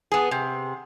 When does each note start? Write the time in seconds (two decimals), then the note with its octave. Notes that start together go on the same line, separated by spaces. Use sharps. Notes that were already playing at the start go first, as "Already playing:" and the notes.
0.12 B3 G#4
0.31 C3